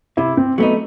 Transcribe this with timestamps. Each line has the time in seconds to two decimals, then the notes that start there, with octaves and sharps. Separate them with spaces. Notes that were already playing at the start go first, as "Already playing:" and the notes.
0.17 C3 E4
0.37 C4
0.58 F#3 A3 B3 D#4